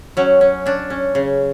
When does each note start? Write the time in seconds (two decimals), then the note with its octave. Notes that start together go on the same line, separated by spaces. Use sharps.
0.17 F#3 C#4
0.41 C#4
0.66 C#4 D4
0.90 C#4
1.15 C#3